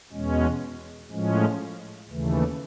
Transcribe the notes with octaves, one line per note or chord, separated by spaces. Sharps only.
E2 B2 G#3 C#4
A2 F3 G#3 C#4
D#2 C#3 E3 A3